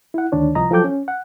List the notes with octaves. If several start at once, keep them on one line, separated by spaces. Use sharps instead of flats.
E4 F#5
D2 D#3 D4 C#5
C2 F3 D#5 A#5
F3 F#3 A4 G5 D6 G6
C#4
F#5